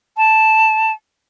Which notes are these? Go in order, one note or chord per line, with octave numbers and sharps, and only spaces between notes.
A5